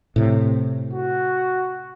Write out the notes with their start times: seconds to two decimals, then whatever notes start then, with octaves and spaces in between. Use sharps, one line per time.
0.16 A2 C3
0.93 F#4